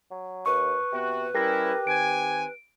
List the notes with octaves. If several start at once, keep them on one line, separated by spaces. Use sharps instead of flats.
F#3
D#2 B4 C#6
C3 B3 F#4
G3 C#4 E4 G4 A#4 A#6
D#3 C4 G#5 D7